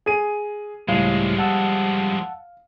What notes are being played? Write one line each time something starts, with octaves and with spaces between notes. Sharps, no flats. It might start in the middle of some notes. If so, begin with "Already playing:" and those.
G#4 D#7
C#2 A2 F3 G3 G#3 F5
F#5 A5 E6